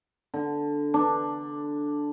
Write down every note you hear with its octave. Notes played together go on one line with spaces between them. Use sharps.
D3
D4